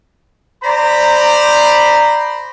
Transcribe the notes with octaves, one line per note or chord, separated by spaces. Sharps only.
C5 D5 A#5 B5